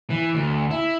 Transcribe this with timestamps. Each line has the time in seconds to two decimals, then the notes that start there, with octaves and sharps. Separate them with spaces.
0.10 E3
0.34 D2
0.71 E4